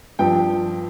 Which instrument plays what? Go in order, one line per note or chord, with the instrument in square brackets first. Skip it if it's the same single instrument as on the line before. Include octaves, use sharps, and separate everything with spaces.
[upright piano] G2 F3 G5